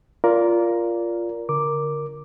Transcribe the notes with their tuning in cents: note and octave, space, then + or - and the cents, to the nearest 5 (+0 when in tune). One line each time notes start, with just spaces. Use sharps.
F4 -10 A#4 +5 D5 -20
D3 -25 A#4 +0 D6 +0